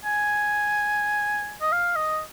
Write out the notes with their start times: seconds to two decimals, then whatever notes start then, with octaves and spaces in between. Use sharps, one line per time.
0.04 G#5
1.61 D#5
1.72 F5
1.96 D#5